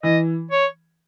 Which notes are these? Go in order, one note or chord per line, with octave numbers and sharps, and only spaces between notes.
E3 D#5
C#5